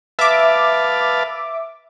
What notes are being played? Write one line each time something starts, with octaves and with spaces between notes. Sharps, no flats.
B4 E5 F5 A5 D6